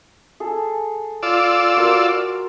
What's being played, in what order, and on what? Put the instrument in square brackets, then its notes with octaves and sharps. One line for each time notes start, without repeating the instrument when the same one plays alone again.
[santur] G#4 A4
[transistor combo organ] F4 D5 E6
[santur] F#4 A#4 C5